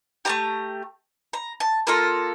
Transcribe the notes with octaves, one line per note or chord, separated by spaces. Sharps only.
A3 D4 G4 A#5
A#5
A5
A#3 F4 A4 A#5